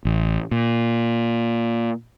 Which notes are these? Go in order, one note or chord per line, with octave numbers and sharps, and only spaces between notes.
A1
A#2